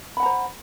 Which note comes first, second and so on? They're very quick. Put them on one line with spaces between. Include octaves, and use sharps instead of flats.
B5 F#5 A#5 C5